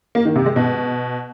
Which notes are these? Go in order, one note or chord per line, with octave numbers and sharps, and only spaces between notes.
A#3
D#3
C3
G#3
B2